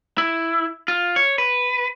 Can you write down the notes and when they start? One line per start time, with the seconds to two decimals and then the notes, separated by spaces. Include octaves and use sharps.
0.18 E4
0.88 F4
1.16 C#5
1.38 B4